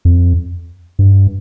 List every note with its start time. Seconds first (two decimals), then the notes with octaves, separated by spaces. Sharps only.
0.05 F2
0.99 G2